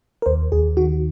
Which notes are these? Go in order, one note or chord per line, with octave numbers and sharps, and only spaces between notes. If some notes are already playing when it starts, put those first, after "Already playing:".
A#4
D#2 C5
D#2 G#4
D#3 F#4